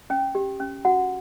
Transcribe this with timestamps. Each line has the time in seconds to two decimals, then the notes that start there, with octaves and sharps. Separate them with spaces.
0.10 C#4 G5
0.35 G4
0.60 C#4
0.85 F#4 F#5